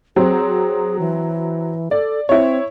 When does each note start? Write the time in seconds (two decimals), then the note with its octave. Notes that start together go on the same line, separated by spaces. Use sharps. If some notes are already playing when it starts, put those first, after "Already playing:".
0.16 F#3 C4 G#4
0.99 E3
1.91 A4 D5
2.29 C4 E4 C#5